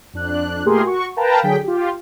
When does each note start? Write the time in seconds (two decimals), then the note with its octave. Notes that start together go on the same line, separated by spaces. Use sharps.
0.14 F2 D4 F#6
0.65 A#2 A3 G4 G#4 A#4 C6
0.83 F#4 C#6
1.16 A#4 B4 F5 G5 A5 A#5
1.43 D3 F#3 G#4 G5 B6
1.63 F4 G4